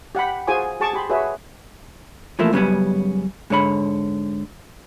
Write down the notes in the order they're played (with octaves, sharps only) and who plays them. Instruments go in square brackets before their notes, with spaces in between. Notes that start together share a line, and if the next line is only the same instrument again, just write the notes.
[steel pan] G4 F#5 G5 B5
F4 F#4 G#4 C5 G#5 D6
F#4 G#4 A5 C#6 D6
G4 B5 C6
F#4 G#4 B4 C#5 E5
[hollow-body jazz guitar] E3 F3 A3 A#3 E4
F#2 C#3 G3 A#3 B3 C#4
G#2 D3 C#5 B5